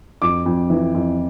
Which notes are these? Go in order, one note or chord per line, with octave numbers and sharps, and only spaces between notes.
F2 D6
F2
E3
F2